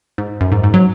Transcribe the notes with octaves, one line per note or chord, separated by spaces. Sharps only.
G#2
F#2
G#2
G#2
F#3